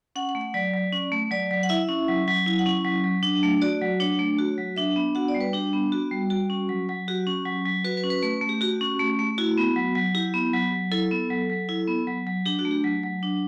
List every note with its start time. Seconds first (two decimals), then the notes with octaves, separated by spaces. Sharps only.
0.16 C#4 F#5
0.29 F#5
0.35 A3
0.41 F#5
0.54 F#3 D5
0.74 F#3
0.92 C#4
1.12 A3
1.31 F#3 D5
1.51 F#3
1.63 F#5
1.69 E4 E5
1.89 C#4
2.08 F#3
2.28 F#3
2.46 E4
2.59 F#5
2.66 C#4
2.84 F#3
3.04 F#3
3.23 D4
3.43 A3
3.62 F#4 D5
3.82 F#3
4.00 D4 C#5
4.19 A3
4.39 F#4
4.58 F#3
4.76 D4 E5
4.96 B3
5.15 F#4 F#5
5.28 D5
5.35 G3
5.41 B4
5.53 D4 G4
5.73 B3
5.92 F#4
6.11 G3
6.30 F#4
6.50 C#4
6.69 F#3
6.89 F#3
7.08 F#4 G4
7.27 C#4
7.46 F#3
7.66 F#3
7.85 F#4 B4
7.97 B4
8.04 C#4
8.10 B4
8.22 A3 B4
8.41 A3
8.49 G4
8.61 F#4 G4
8.81 C#4
8.99 A3
9.19 A3
9.38 E4 F#4
9.58 B3
9.76 F#3
9.95 F#3
10.15 E4 G4
10.34 B3
10.53 F#3
10.72 F#3
10.91 E4 A4
11.11 B3
11.30 F#3
11.50 F#3
11.69 E4
11.88 B3
12.07 F#3
12.27 F#3
12.46 D4 G4
12.59 F#4
12.65 A3
12.71 G4
12.84 F#3
13.03 F#3
13.23 D4